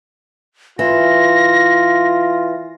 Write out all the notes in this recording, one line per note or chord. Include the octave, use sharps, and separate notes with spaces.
E3 F4 A#6